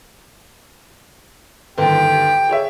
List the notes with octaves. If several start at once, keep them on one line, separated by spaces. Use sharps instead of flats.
G1 D#2 G4 G5
G#4 C#5 E5